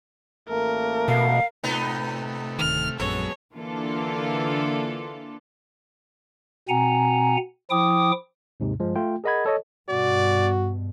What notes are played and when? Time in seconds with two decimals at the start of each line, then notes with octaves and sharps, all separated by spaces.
0.49 A1 A3 A#3 A#4
1.08 B2 F5
1.64 A2 C3 A3 B3 D#4
2.58 D1 D#3 F6
3.00 A#1 F#2 F#3 G#3 B3 A4 C#5
3.55 D3 E3 A#3 D4 F4 A4
6.69 B2 C4 F#5 G#5 A#5
7.71 F3 E4 G5 D6 D#6
8.60 D#2 G#2 C3
8.80 G2 F3 G#3
8.96 A3 F4 G5
9.24 G#4 A#4 D#5 F#5 B5 G#6
9.46 A4 C#5 D#5
9.89 G2 B2 F#4 D5